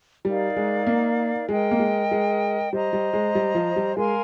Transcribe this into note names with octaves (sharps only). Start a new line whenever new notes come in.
G3 D#4 A#4 D5 F5
G#3
A#3
G#3 A#4 D#5 G5
A#3
G#3
G#3
G3 C5 D#5 A#5
G3
G#3
G3
F3
G3
G#3 A#4 F5 G#5 C6